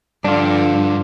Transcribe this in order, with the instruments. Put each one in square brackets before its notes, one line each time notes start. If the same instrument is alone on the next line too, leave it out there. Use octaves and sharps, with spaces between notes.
[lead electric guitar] G2 [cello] D3 F3 [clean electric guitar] D4 F4